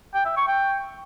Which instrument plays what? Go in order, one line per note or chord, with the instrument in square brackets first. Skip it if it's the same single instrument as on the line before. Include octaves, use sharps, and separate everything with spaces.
[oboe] G5
E5
C#6
G5